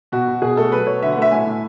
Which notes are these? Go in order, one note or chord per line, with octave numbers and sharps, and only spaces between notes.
B2 F#4
B2
B2 G#4
A3 A4
F#3 B4
F#3 C#5
D3 E5
F#5
A3 E5
A2 G#5
A2